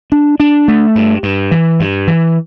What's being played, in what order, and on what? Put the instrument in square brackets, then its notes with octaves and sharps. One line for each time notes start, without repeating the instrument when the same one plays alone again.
[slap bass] D4
D4
A3
G2
G2
E3
G2
E3